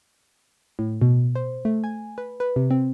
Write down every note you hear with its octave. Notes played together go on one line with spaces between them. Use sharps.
A2
B2
C5
A3
G#5
B4
B4
C3
C4